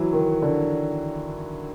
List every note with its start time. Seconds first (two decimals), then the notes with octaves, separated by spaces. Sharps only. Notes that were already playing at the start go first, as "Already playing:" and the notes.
Already playing: E3 F#3
0.13 D#3
0.42 D3